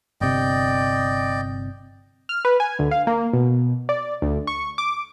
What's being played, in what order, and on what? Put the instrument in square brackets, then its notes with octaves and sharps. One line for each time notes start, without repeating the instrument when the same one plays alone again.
[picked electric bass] G1 C3 [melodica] D5 D#5 G5
[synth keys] F6
B4
G#5
D2
F5
A#3
B2
D5
D2
C#6
D6